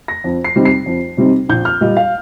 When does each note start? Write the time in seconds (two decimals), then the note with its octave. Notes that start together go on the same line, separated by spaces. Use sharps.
0.08 A#6
0.24 F2
0.44 C7
0.55 C3 G3 C4 D#4
0.65 C7
0.86 F2
1.17 C3 G3 C4 D#4
1.49 A#1 G6
1.65 F6
1.81 A#2 G3 D#5
1.97 F5